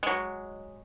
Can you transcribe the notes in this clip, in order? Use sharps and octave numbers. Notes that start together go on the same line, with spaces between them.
F#3 G#3